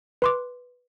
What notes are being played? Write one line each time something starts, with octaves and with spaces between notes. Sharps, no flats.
B4 C6 D6